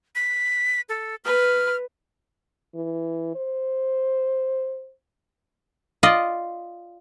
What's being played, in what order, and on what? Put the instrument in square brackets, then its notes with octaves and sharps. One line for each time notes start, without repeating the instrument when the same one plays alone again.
[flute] B6
A4
[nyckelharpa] B4 [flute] F6
[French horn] E3
C5
[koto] F4 D5 D#5